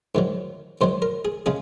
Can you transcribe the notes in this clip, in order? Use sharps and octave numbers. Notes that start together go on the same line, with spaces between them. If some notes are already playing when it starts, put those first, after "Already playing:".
G#2 D#3 F#3
G#2 D#3 F#3 C5
A#4
G#4
C#3 G#3 G#4